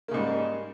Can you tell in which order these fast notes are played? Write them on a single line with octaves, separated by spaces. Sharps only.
A#3 C#3 G#2 G3